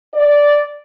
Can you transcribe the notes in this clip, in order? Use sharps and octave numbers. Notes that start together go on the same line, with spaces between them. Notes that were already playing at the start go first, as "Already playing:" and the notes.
D5